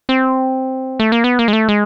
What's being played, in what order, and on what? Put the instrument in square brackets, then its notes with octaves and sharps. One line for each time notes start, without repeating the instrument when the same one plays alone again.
[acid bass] C4
A3
A#3
B3
A#3
G#3
A3
G#3